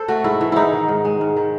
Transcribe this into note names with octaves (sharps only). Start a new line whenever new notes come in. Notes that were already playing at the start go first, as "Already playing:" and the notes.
Already playing: A4 C5
A3 F#4
G#2 E4
E3
G#2 D#4 E4
D#3
G#2
G#3
G#2
D#3